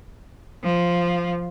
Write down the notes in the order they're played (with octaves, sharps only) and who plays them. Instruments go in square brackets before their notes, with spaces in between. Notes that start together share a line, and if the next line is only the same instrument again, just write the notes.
[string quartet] F3